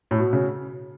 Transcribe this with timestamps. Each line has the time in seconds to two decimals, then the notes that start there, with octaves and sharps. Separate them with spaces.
0.11 A2
0.18 B2
0.33 C#3